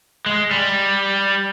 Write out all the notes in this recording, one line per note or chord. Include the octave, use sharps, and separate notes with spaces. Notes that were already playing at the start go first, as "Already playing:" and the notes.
G#3
G3